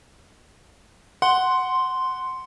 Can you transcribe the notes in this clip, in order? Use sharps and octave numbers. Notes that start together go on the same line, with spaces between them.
F#5 C6